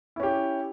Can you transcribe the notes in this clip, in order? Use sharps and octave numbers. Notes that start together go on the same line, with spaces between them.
C#4 E4 G4